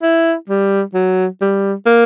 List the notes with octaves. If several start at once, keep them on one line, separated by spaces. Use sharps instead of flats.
E4
G3
F#3
G3
A#3